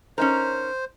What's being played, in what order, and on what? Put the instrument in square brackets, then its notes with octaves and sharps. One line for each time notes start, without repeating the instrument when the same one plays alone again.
[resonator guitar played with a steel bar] C#4 D#4 A#4 [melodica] C5